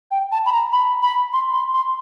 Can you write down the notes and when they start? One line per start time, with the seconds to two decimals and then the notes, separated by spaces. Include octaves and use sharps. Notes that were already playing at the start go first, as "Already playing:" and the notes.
0.11 G5
0.32 A5
0.46 B5
0.52 A#5
0.72 B5
1.02 B5
1.33 C6
1.54 C6
1.74 C6